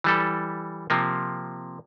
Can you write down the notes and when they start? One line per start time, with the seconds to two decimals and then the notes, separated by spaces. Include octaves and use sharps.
0.04 E3 G3 A4
0.90 C3 F3 A#3